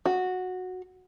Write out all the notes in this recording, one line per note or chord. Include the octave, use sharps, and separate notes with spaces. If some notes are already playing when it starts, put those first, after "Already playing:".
F#4